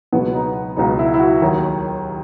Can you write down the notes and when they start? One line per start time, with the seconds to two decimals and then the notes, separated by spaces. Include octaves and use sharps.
0.12 C#2 B2 F#3 B3
0.34 D#4
0.77 C#2 B2 F#3 D#4
0.99 E4
1.14 E4
1.19 F#4
1.41 D#2 D#3 F#3